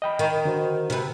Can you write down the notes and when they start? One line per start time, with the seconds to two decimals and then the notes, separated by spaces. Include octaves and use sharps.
0.02 D#5 G5 B5
0.19 D#3
0.45 D3 F#4 C5
0.90 C3 B4